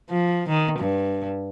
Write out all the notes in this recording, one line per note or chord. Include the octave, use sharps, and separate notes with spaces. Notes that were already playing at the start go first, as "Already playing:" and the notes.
F3
D#3
G2